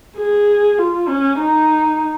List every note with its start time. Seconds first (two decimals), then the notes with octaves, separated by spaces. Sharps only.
0.18 G#4
0.79 F4
1.08 C#4
1.38 D#4